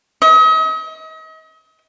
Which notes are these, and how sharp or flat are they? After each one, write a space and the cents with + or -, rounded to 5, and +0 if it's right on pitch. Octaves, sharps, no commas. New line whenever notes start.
D#5 +40